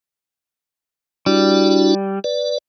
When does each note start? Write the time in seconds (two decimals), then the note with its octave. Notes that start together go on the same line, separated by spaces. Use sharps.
1.26 G3 D4 E4 F#4
2.24 B4 D5